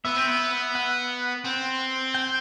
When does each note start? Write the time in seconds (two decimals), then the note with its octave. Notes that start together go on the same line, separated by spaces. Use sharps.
0.05 B3 E5
0.16 C4
0.27 B3
0.75 F#5
1.44 C4
2.14 G5